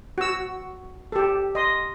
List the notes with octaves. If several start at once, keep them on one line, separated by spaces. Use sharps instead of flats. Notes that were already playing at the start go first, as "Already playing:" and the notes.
F#4 E6
G4 A4
D#5 C6